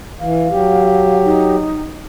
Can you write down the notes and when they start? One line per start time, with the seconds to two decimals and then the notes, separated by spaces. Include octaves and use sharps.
0.20 E3 F5
0.50 F#3 G4
1.25 D#4